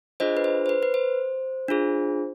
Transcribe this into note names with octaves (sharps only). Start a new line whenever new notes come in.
D4 F4 G#4 C5 D#5
B4
C5
C5
B4
B4
C5
D4 F4 G#4